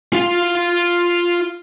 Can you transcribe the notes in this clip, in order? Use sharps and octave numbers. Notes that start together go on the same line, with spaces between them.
F4 F5